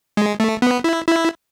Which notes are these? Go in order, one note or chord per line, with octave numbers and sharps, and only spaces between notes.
G#3
A3
B3
E4
E4